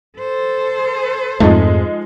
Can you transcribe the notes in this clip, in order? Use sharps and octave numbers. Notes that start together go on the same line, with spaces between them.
A4 C5
F2 G#2 F3 G#3 A3 D#4